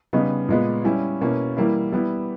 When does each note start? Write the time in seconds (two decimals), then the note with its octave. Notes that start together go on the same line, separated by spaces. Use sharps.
0.13 C#3 G3 B3 D#4
0.49 A#2 G#3 B3
0.85 G3 C#4 E4
1.21 B2 A#3 C#4 E4
1.57 E3 G3 A#3 E4
1.92 G3 B3 E4